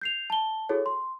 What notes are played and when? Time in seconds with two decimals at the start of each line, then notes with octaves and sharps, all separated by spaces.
0.01 G6 C7 F7
0.30 A5 G7
0.69 E4 F#4 G#4 A4 C#5
0.86 C6